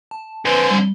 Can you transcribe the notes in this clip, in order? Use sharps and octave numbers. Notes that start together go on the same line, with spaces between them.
A5
F2 D3 B4 C5 G#5
G3